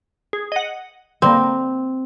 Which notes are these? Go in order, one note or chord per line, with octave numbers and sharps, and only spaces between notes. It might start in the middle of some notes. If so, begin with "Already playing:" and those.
G#4
D#5 F#5
D3 G3 A#3 C4